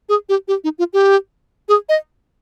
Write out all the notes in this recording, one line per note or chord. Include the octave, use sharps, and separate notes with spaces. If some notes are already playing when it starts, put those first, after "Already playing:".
G#4
G4
G4
D#4
F4
G4
G#4
D#5